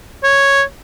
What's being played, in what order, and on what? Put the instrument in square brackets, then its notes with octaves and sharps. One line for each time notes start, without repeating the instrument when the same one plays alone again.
[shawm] C#5